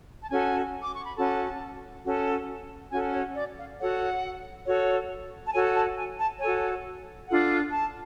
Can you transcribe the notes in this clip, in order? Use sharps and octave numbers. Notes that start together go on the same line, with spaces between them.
A5
C#4 F#4 A4 G#5
D6
C#6
B5
C#4 F#4 A4 A5
C#4 F#4 A4
C#4 F#4 A4 G#5
C#5
D5
F5
F#4 A4 C#5 F#5
F#4 A4 C#5
A5
F#4 A4 C#5 G#5
A5
G#5
A5
F#4 A4 C#5 G#5
D4 F4 A4 F#5
A5